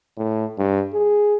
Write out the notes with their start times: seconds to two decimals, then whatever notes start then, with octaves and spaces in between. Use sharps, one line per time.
0.17 A2
0.58 G2
0.94 G#4